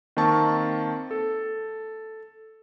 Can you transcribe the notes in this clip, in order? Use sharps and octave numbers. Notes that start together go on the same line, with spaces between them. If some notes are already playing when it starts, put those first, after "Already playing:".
D#3 A#3 C4 A5 C#6
A4